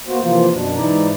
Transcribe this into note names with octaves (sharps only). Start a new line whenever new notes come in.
A#3 B3 F#4 C5
C3 E3 F3 A#3 F4
F#2 B2 D4
G#2 E3 D#4 E4 D5 A#5